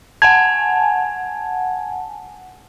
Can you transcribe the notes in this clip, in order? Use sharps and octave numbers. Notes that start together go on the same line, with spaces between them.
F#5 G#5 A5 G#6